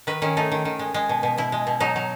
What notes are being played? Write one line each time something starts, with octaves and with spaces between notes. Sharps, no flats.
D#3 B4
D#3 C#4
A3 D#4
D#3
D#3
G#3
G#3
B2
B2
B2 E4
G#3
B2
F#3 D#4
F#3